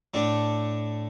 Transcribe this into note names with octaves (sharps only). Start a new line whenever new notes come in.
A2 A3 D4